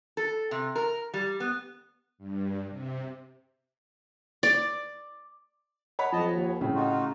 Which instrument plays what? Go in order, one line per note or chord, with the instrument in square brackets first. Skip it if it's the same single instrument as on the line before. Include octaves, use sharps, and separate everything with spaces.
[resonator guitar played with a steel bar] A4
C3
A#4
G3
B3
[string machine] G2
C3
[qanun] D5
[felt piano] C#5 F#5 B5
[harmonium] F2 D#5 A5 [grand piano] F3
[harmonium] D#2
[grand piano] A2 [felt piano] C#3
[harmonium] D#4 F4 F#4